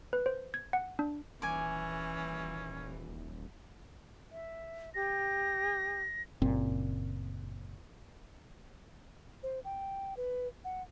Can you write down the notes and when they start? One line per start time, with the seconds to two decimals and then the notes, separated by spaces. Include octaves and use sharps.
0.13 B4
0.26 C5
0.54 G#6
0.73 F#5
0.99 D4
1.42 D#1 E3 C#4 G#5 D6
4.31 E5
4.94 G4 A#6
6.42 F#1 A#2 C4
9.43 C5
9.65 G5
10.17 B4
10.65 F#5